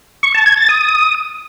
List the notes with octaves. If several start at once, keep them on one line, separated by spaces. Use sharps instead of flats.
C#6
A5
G#6
A6
D#6